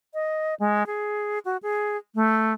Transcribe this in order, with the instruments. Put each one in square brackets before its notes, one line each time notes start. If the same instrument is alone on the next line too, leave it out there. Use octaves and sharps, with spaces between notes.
[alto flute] D#5
G#3
G#4
F#4
G#4
A3